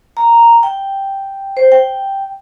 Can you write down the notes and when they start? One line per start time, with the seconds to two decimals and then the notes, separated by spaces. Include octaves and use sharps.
0.17 A#5
0.63 G5
1.57 C5
1.72 G5